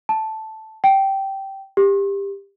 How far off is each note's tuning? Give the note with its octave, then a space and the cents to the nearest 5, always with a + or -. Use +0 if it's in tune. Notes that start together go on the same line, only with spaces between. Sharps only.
A5 -5
G5 -10
G4 +20